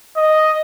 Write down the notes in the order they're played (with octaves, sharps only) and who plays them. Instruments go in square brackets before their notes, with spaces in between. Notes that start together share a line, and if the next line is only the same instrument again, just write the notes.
[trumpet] D#5